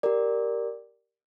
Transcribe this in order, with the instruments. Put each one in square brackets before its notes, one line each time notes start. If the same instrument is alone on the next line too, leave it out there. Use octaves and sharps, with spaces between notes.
[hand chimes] G4 A#4 D5